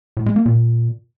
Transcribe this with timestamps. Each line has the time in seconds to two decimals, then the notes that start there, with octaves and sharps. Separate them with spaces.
0.17 A2
0.26 G#3
0.36 A#3
0.46 A#2